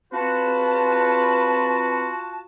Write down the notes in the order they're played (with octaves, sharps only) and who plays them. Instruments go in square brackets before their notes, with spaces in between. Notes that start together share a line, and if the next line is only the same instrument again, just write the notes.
[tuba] C4 [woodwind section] F4 F#4 [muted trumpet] B4 [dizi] A5